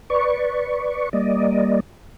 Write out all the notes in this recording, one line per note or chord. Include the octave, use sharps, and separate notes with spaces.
B4 D5 C#6
G3 A#3 D5 D#5